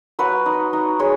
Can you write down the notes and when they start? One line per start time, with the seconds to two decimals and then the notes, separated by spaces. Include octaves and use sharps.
0.19 F#3 F#4 B4
0.46 D#4
0.73 D#4
0.99 G#3 G#4 C#5